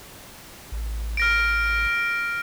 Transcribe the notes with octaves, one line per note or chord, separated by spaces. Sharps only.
A1
F6 A#6 D7